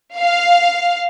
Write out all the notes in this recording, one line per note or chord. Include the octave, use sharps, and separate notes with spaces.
F5